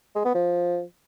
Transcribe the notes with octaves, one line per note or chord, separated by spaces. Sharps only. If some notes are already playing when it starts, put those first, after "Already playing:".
G#3
B3
F3